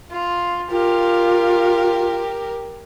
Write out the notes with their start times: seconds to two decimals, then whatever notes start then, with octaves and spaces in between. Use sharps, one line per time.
0.11 F4
0.70 F4 G4 A#4